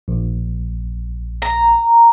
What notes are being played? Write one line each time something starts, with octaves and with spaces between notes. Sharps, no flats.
A#1
A#5